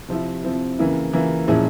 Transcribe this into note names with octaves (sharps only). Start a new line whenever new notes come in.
C3 F3 C4 E4
C3 F3 C4 E4
C#3 E3 A#3 E4
C#3 E3 A#3 E4
A#2 F3 G#3 C#4 E4